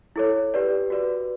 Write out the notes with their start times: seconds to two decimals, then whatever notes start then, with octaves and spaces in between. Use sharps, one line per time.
0.16 E4 A4 C#5
0.54 G4 B4 D5
0.90 F#4 B4 D5